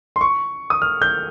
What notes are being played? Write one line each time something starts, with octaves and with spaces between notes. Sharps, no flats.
C6
C#6
D#6
F6
G6